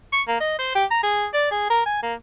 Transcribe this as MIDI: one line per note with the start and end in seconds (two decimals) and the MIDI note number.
0.12 0.22 85
0.28 0.40 58
0.40 0.58 75
0.59 0.72 72
0.75 0.85 67
0.91 0.99 82
1.03 1.26 68
1.34 1.46 74
1.51 1.66 68
1.70 1.83 70
1.86 2.01 80
2.02 2.14 58